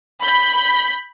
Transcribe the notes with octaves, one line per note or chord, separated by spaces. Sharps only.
B5 G6 B6